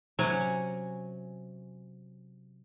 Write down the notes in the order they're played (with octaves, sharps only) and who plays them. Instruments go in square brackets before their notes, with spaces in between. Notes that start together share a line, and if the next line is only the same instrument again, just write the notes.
[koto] C3 F#3 C#4 C#5 F#5 G#5